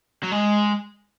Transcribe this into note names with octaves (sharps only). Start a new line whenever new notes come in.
F#3
G#3